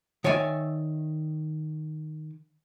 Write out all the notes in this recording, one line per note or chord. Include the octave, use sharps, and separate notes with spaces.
D#3 C#5 D5 E5 G#5